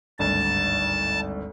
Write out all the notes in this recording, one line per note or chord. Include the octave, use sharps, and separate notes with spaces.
G#1 D2 G2 A5